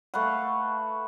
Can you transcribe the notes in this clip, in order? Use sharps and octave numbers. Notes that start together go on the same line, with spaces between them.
A3 B4 F5 F#5